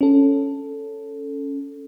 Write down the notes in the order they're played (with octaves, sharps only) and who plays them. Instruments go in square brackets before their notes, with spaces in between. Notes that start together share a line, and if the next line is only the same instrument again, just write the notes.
[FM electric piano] C#4 A4